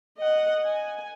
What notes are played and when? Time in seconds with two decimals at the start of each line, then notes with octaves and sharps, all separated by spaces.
0.18 D#5 F#5
0.65 G#5